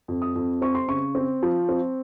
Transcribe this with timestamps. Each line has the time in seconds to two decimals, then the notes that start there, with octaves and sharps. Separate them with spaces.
0.08 F2
0.22 D#6
0.36 F2
0.62 C4 C#6
0.75 C6
0.89 C#3 C#6
1.15 C4
1.43 F3
1.69 C4